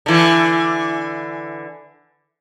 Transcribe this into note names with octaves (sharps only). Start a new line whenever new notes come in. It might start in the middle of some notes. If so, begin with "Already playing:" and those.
D3 E3